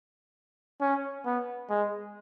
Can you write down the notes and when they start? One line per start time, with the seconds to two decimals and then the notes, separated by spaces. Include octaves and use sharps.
0.81 C#4
1.26 B3
1.70 G#3